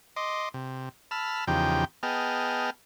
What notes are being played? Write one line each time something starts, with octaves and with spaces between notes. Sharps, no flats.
D#5 C6 D6
C3
A5 B5 E6 F6
E2 C#3 F3 D#4 G4 G5
B3 G#4 D#5 G5 A5 F6